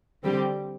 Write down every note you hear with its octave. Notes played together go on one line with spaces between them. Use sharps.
D3 G3 C4 G4